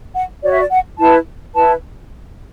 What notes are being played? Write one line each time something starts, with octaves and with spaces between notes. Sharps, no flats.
F#5
F#4 C#5 D5
E5
D5
F#5
E4 B4 A5
E4 B4 A5